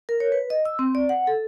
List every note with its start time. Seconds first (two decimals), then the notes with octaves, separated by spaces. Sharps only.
0.09 A#4
0.20 C#5
0.32 B4
0.50 D#5
0.65 E6
0.79 C4
0.95 D5
1.09 F#5
1.27 A4